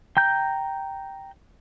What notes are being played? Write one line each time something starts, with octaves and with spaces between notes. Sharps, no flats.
G5 A#5 G6